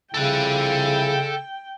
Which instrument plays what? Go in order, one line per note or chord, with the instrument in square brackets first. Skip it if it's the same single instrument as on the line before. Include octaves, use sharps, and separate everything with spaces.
[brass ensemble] C2 F3 E4 [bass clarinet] C#3 [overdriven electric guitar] A4 F#5 [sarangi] G5